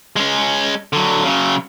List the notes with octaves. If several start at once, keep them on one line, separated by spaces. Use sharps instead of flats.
G#3 C#4
D3 F#3
C#3 F#3